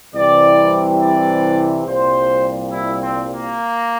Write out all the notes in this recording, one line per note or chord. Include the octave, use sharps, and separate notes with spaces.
C2 C3 E3 G3 D5
D5
C2 A#2 G3 C5
E4
C4
A#3